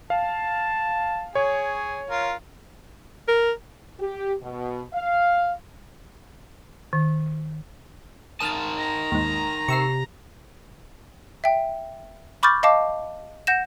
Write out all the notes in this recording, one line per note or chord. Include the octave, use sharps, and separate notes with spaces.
F5 A5
G#4 C#5
F4 A#4
A#4
G4
B2
F5
D#3
D#4 A#4 A5 D#6 F6 A6
A#5
D#2 G#2
C3 C#6 E6 C7
E5 G5
B5 C#6 D6 F6 G6 A6
D#5 F5 A5 D6
F#5 G6 A#6 E7